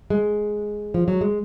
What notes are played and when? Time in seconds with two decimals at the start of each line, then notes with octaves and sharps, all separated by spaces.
0.10 G#3
0.94 F3
1.08 F#3
1.21 G#3